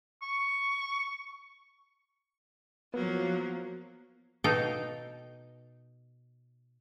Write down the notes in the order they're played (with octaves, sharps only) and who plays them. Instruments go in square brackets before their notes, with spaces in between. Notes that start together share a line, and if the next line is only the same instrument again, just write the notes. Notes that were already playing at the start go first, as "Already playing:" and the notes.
[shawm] C#6
[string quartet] F3 F#3 A#3 [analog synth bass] B3
[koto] B2 D#4 A4 F5 G5